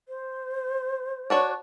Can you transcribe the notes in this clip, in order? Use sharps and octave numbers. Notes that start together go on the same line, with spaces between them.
C5
D4 F#4 C#5